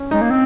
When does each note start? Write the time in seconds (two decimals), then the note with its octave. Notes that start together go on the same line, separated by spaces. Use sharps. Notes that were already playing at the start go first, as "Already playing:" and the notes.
Already playing: C#4
0.11 G#3 D#4
0.21 A#3
0.30 C4